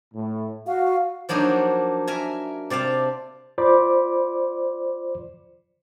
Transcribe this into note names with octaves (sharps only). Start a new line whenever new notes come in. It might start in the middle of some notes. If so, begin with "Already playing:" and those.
A2
F#4 F5
F3 F#3 A#3 D4 D#4
A#4 E5 G#5
C3 D5 F5 A5
F4 C5 D5 B5 D6